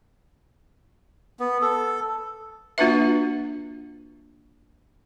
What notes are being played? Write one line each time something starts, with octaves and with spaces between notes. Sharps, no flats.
B3
A4
A#3 D4 F4 F#4 B4 E5